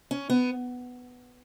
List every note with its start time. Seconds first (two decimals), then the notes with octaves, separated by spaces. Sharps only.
0.11 C#4
0.30 B3